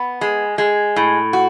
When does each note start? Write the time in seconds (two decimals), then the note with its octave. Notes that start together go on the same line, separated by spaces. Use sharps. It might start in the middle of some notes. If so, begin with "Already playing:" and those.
Already playing: B3
0.21 G#3
0.58 G#3
0.96 A2
1.33 F#4